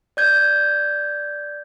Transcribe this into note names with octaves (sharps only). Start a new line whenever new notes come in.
D5 G6 G#6